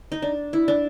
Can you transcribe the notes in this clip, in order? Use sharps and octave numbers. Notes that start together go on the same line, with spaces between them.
D#4
D4
E4
D4